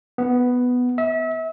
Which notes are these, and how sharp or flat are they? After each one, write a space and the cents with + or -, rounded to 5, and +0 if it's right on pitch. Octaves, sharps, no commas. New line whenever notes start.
B3 +5
E5 -30